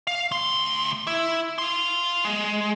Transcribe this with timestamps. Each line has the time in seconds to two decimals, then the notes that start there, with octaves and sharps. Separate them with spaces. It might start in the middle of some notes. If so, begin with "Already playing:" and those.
0.07 F5
0.31 D2 C6
1.07 E4
1.58 F5 C6
2.25 G#3